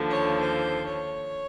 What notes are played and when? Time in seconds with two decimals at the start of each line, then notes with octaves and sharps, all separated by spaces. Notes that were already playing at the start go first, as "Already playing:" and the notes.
Already playing: D#2 D3 F3
0.12 C#5
0.42 C5
0.88 C#5